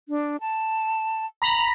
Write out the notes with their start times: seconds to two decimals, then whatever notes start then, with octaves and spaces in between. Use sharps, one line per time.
0.09 D4
0.41 A5
1.42 A#5 B5